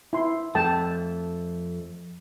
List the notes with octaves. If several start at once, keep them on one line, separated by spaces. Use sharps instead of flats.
E4 C6
F2 A3 G5 A5